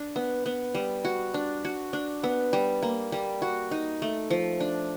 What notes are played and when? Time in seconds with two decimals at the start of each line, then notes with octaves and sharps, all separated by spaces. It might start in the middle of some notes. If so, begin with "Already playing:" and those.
Already playing: D4
0.16 B3
0.46 B3
0.75 G3
1.05 F#4
1.34 D4
1.65 F#4
1.93 D4
2.23 B3
2.53 G3
2.83 A#3
3.12 G3
3.42 F#4
3.71 D#4
4.02 A3
4.30 F3
4.60 D4